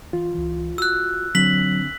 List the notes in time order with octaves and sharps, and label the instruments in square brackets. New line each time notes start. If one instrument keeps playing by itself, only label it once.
[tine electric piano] E3 [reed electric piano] F4
[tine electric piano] C#2 E3
[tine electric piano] F#4 [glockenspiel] E6 F#6
[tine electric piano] D3 C4 D4 [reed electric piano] F#3 [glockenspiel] B6 F#7